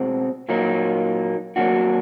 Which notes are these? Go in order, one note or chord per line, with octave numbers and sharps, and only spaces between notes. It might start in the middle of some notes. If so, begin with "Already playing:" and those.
Already playing: B2 G#3 C4
A#2 F#3 A#3 D#4
F#3 A#3 D4 F#4